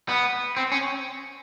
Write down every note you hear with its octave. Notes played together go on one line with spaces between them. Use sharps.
B3
C4
C#4